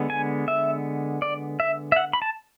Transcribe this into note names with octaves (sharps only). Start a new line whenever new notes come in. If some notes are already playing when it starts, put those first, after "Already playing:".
Already playing: D3 G#3 B3
G#5
E5
D5
E5
E5
F#5
B5
A5